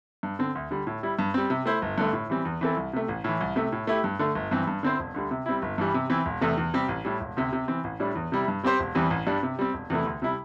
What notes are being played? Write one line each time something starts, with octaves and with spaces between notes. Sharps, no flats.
G2
D3 C4
D2
D3 G3
A2
G3 E4
G2
G3 C4
C3
A3 E4 C5
G1
G2 D3 A3
A2
E3 G3 C4
E2
E3 C4 E4 A4
C2
C3 A3
A1
A2 E3
C2
C3 A3
A2
A3 E4 G4
G2
D3 A3
G1
G2 E3 C4
G2
D3 C4 E4 C5
E1
D2 D3 G3
C3
G3 C4 E4
G1
G2 E3 G3
C3
E3 C4 E4
E1
E2 C3 A3
E2
C3 G3 C4 G4
A1
A2 G3
E1
D2 C3
C3
E3 C4
A1
A2 G3 D4
E2
C3 G3 E4
G2
G3 C4 G4 C5
E1
E2 E3 G3 C4
A1
G2 G3 D4
C3
G3 C4
E1
E2 C3 A3 E4
D2
C3 G3 E4